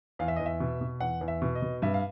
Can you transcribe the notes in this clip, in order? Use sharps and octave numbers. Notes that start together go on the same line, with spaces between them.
E2 F5
E5
E2 D#5
E5
B2
B2
E2 F#5
E2
E5
B2
D#5
B2
G2 E5
F5